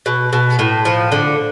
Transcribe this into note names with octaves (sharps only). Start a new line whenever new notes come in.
B2
B2
A2
F3
D3